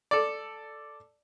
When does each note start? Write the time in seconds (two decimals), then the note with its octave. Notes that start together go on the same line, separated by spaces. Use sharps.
0.11 A4 D5